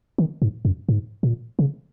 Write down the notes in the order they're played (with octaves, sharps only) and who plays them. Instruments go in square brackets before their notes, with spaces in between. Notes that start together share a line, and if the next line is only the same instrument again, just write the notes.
[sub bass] D#3
G#2
F#2
G#2
A#2
C#3